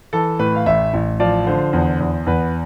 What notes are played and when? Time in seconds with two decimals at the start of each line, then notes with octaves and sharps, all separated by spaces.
0.13 E3 A4
0.39 A2 B4
0.55 F5
0.66 A1 E5
0.94 A1
1.20 F3 D5
1.47 D3 C5
1.73 E2
2.00 E2
2.26 E2 B4